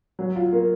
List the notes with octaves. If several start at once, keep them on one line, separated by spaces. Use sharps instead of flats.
F#3
F4
A#3